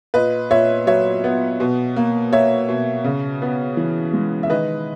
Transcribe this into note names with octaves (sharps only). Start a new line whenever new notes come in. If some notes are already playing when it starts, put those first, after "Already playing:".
A#2 B4 D#5
A#2 C#5 E5
F#3 C#5 E5
B3
B2
A#3
A#3 C#5 E5
B2
C#3
B3
E3
G#3
E5
D#3 B4 D#5